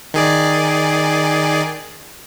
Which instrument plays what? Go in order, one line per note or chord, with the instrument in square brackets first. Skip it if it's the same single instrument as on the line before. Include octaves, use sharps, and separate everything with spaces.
[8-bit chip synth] D#3 G#4 D5